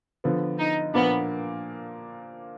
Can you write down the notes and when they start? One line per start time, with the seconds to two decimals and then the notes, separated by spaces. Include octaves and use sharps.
0.24 D3 F3 B3
0.58 D#4
0.94 A#2 F3 A#3 B3 D4